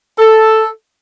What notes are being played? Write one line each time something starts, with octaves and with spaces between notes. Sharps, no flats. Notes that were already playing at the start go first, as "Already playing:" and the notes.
A4